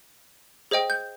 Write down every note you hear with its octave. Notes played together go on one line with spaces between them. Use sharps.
G#4 C5 D#5 G5
G6